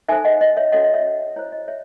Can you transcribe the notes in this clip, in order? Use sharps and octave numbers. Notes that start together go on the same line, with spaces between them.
D#4 A4 C5 E5 G#5
D#5 F#5
D#5
C#5 E5
C#4 F#4 A4 C#5 D#5 F#5
D#5
C#5 E5
E4 C5 C#5
D#5
C#5 E5